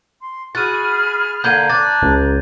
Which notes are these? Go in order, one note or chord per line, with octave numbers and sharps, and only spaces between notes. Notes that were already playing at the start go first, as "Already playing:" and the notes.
C6
F#4 G#4 B5 F6 A6 D#7
D3 A#3 G6 G#6 D#7
D4 A#5 A6
C#2